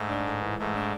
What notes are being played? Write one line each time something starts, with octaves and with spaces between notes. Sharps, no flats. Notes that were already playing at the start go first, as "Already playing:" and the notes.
Already playing: G#2 A3
D4
A2
E3
G#2 A3
D4